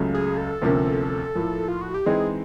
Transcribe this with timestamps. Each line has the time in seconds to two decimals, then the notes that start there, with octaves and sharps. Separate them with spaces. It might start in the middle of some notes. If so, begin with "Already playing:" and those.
Already playing: C#2 C#3 F#3 A3
0.15 G#4
0.37 A4
0.62 D2 C3 F3 A#3 C#4
1.35 A2 F3 A#3
1.68 F4
1.81 F#4
1.94 G4
2.06 E3 G#3 C4 D#4 G#4